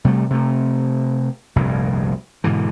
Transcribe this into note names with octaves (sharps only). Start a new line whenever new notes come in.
C3 G3 A3
C3 A3
F1 C2 G2 A#2
G#2 B2 D3 E3